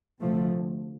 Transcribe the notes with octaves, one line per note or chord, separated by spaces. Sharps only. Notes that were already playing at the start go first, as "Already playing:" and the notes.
D2 C3 F3 A3